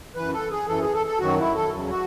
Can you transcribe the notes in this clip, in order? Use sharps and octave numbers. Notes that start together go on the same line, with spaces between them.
F#2 E3 B4
A4
G#4
F#2 E3 A4
G#4
A4
A4
F#2 D#3 F#3 F#4
E4
A4
E2 C#3 F#3
F#4